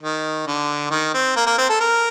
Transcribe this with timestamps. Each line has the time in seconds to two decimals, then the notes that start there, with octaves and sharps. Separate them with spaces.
0.02 D#3
0.47 D3
0.91 D#3
1.14 C4
1.36 A#3
1.47 A#3
1.58 C4
1.69 A4
1.80 A#4